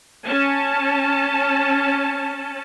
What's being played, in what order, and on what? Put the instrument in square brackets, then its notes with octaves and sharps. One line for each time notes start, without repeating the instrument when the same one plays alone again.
[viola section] C#4 A5